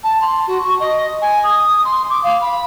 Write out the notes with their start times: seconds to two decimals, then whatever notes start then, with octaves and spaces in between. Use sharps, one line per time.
0.03 A5
0.21 C6
0.47 F#4
0.63 C#6
0.80 D#5
1.21 G#5
1.43 D#6
1.84 C6
2.10 D6
2.23 F5
2.41 B5